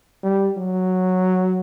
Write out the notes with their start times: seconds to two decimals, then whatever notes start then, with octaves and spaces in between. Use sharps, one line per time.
0.23 G3
0.57 F#3